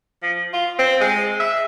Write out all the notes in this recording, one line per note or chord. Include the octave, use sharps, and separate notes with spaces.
F3
F4
C4
G#3
E5